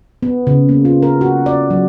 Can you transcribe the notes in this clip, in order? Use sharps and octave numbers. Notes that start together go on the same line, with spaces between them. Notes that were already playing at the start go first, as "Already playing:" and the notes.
B3
C#3
A#3
F4
A#4
F#4
D5
F#3